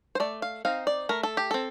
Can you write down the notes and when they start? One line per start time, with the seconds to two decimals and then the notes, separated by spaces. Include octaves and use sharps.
0.15 C5
0.20 A3 D5
0.42 F5
0.65 C4 D#4 F5
0.87 D5
1.09 A3 A#4
1.23 A4
1.37 G4
1.51 C4 A4